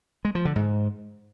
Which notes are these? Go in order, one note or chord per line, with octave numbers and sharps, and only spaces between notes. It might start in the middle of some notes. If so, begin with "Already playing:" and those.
G#3
F3
D3
G#2